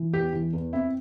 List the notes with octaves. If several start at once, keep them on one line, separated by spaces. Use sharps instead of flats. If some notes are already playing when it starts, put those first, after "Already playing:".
Already playing: E3
E2 G4
E3
E2
C4 E4